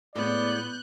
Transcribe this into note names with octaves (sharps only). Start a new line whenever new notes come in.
A2 G#3 B3 D5 F#6 G6